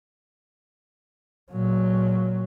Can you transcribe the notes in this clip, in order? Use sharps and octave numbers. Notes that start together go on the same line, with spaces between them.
A#2 F#3